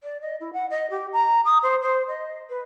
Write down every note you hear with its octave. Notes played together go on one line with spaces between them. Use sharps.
D5
D#5
E4
F#5
D#5
G4
A#5
D#6
C5
C5
D#5
B4